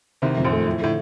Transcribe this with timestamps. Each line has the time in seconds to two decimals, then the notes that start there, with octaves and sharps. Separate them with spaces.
0.22 C2 C3 D#3
0.37 F2
0.45 A#1 A#2
0.52 A3
0.66 A2 F3
0.81 A2 D3